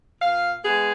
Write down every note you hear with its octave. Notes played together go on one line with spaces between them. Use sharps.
A#2 F5
G#3 B3 G#4